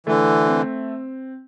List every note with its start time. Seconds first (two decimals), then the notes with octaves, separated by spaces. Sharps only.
0.07 D3 E3 A3
0.46 C4